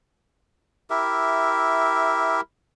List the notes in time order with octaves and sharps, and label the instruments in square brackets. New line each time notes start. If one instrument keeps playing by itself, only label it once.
[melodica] E4 G4 A#4 E5